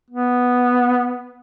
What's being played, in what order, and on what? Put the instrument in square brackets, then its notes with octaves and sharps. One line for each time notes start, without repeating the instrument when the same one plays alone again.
[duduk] B3